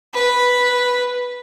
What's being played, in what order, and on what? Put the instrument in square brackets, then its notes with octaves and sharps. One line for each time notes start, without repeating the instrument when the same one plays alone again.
[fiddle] B4